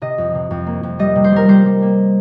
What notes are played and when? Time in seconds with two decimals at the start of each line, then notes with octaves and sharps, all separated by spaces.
0.02 C3 D#5
0.18 F2
0.35 C3
0.51 F2
0.67 A#3
0.83 F2
0.99 G3 D#5
1.16 C3
1.24 C5
1.32 G3 A#4
1.48 G3 C5
1.66 G3
1.82 A#3